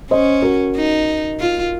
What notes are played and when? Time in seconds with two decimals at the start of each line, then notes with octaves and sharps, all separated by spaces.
0.11 C#4 C5 D#5
0.42 F#4 A#4
0.76 D#4
1.40 F4